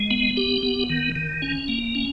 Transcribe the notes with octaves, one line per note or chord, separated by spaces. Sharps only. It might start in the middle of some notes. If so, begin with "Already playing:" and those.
Already playing: G#3
B3
G4
B3
D#3
D#3
C#4
A#3
C#4